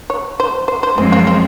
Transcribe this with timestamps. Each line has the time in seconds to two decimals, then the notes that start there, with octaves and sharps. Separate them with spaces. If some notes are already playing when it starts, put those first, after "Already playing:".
0.10 C#5
0.40 C5
0.68 C5
0.83 C5
0.97 F#2 F3 G#3 C4 G#4
1.12 F4
1.27 F4